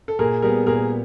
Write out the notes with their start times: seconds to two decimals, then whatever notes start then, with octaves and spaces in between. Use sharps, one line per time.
0.08 A4
0.19 A#2 G#4 A#4
0.42 G3 B3 G#4 A#4
0.66 A#2 G#4 A#4